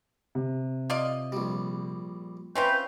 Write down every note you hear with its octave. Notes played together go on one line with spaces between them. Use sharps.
C3
F4 D5 D#5
A#1 G3
C4 C#4 F4 B4 E5 G5 G6